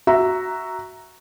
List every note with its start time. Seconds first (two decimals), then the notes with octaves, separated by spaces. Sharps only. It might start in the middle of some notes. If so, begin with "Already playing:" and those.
0.07 F#4 E5 A#5